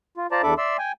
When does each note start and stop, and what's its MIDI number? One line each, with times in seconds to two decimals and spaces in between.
0.17 0.27 65
0.31 0.42 65
0.31 0.42 72
0.31 0.42 74
0.31 0.42 81
0.31 0.42 82
0.43 0.54 40
0.43 0.54 62
0.43 0.54 69
0.43 0.54 76
0.43 0.54 83
0.43 0.54 86
0.58 0.77 74
0.58 0.77 76
0.58 0.77 84
0.58 0.77 88
0.79 0.92 79
0.79 0.92 80